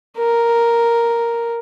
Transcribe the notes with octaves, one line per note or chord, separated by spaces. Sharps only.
A#4